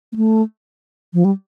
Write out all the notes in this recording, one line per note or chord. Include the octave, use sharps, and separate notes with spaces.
A#3
A3
F3
G3